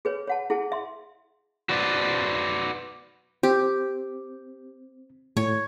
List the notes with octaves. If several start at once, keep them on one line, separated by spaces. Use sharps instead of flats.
G#4 B4 C#5
C#5 F#5 A5
E4 G#4 F#5 A5
E5 C6
F#4 B4 C5 D5
C4 G4
A2 C#5